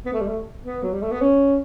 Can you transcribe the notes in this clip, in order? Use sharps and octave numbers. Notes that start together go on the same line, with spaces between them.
B3
A3
G3
A3
B3
F#3
G3
A3
B3
C#4